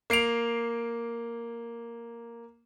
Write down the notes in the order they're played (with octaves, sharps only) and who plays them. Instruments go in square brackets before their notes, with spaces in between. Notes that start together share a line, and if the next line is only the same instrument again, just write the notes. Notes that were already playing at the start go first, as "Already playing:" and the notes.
[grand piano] A#3 C7 D7 F7